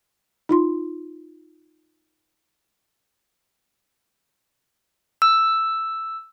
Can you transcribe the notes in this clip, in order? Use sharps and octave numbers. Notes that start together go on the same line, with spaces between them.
D#4 F4 C6
E6